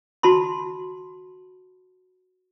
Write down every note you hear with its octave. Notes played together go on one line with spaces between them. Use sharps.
F#4 A5 B5 C6